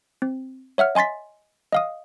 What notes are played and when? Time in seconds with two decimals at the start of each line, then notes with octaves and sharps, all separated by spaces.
0.22 C4
0.78 C#5 E5 F#5 F6
0.95 D#5 G#5 C6 A6 B6
1.72 D#5 F5 D#6